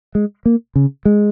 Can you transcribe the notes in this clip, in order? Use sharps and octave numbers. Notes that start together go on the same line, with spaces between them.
G#3
A#3
C#3
G#3